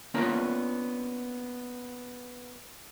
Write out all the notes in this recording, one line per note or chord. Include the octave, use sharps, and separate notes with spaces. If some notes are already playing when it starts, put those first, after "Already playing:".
A#3 B3 C#4 D4 F4 A#4